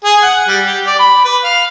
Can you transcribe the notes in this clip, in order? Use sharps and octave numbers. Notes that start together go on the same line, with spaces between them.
G#4
F#5
G3
G4
D5
B5
B4
F5